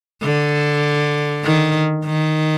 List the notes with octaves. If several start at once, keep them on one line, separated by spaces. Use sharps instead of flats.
D3
D#3
D#3